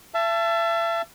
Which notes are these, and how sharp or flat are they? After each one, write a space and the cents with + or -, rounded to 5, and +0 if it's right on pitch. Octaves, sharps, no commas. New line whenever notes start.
E5 +35 A5 +0